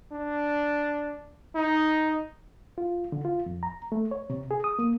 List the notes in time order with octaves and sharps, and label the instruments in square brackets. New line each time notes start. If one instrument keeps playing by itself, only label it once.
[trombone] D4
D#4
[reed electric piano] F4
D3
F4
F2
A#5
A3
C#5
C3
G#4
D#6
A#3